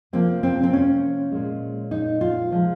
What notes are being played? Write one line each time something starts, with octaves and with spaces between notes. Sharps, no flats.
C3 F3 A#3 C4
C4
C4
C#4
A#2 G#3
D#4
F4
C3 F3 G#3